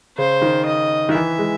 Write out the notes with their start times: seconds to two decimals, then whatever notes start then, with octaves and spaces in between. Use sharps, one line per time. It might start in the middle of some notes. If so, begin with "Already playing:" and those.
0.17 C#3 C5
0.42 D#3
0.65 D#5
1.09 D#3
1.14 E3 E5
1.39 G#3